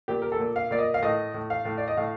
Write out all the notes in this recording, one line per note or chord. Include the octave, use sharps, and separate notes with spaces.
A#2 G4
A#4
A4
A#2
F5
A#2 D5
D#5
F5
A2 D#5
A2
F5
A2
D5
D#5
A2 F5